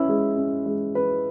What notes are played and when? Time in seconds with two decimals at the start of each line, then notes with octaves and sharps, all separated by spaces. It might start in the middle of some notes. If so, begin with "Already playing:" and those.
Already playing: C#4 E4 B4
0.08 G#3
0.37 C#4
0.66 G#3
0.95 B4